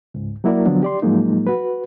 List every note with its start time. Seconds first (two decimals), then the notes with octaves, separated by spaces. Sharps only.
0.14 C#2 G#2
0.44 F#3 A#3 E4 F#4 A#4 D5
0.66 D3 F3 F#3 B3 D4
0.83 G4 D5 C6
1.02 A2 F3 F#3 G#3 A#3 D#4
1.47 F#4 B4